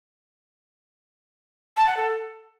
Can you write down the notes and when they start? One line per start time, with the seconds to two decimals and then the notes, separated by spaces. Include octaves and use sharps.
1.77 A5
1.87 F#5
1.97 A4